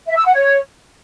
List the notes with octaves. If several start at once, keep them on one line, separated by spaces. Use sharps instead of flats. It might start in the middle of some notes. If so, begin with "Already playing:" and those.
E5
E6
F#5
C#5